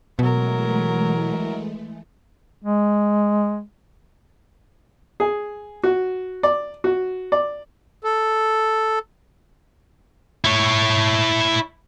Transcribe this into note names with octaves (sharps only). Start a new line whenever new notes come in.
B2 E3 F#3 G#3 A3 A#4
G#3
G#4
F#4
D5
F#4
D5
A4
E4 C#5